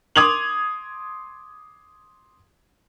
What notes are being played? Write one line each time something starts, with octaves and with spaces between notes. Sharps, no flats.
C6 D6 D#6 G#6 F7 F#7